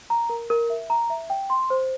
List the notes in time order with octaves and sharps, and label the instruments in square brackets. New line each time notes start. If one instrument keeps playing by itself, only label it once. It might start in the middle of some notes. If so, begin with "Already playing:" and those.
[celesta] A#5
A#4
A#4
E5
A#5
E5
G5
C6
C5